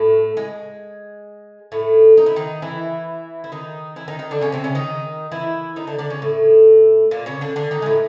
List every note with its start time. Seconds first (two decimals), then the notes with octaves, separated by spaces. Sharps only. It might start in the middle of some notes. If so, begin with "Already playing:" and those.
Already playing: A2 A3
0.37 G#3
1.72 A2 A3
2.17 D#4
2.26 E4
2.36 D#3 D#4
2.62 E3 E4
3.44 E4
3.52 D#3 D#4
3.96 E3 E4
4.08 D#3 D#4
4.19 D#3 D#4
4.31 D3 D4
4.42 C#3 C#4
4.52 C3 C4
4.64 C#3 C#4
4.75 D#3 D#4
5.32 E3 E4
5.76 D#3 D#4
5.87 D3 D4
5.98 D3 D4
6.10 C#3 C#4
6.22 A2 A3
7.11 A#2 A#3
7.26 C#3 C#4
7.41 D3 D4
7.56 D3 D4
7.71 D#3 D#4
7.82 G#3
7.86 A2 A3